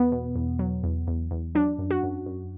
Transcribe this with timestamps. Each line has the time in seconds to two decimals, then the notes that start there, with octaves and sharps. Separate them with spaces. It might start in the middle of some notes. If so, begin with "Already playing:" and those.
Already playing: E2 B3
0.12 B2
0.35 E2
0.59 F#3
0.84 E2
1.07 E2
1.31 E2
1.55 F#3 D4
1.79 F#2
1.91 F#4
2.03 F#2
2.26 F#2